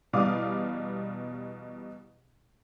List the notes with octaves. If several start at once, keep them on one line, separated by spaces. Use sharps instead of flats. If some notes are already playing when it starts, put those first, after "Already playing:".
E2 B2 G3 F5 D6 D#6